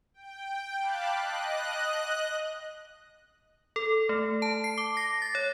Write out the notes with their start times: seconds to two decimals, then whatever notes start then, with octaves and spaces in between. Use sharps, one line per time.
0.14 G5
0.81 F5 A5 B5 D6 F#6
1.16 D#5 F#6
3.76 A4
4.09 A3
4.42 A5
4.64 C7
4.78 D6
4.97 A#6
5.22 A6
5.35 C#5